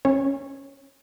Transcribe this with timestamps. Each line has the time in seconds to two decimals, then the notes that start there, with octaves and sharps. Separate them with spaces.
0.05 C#4 C#5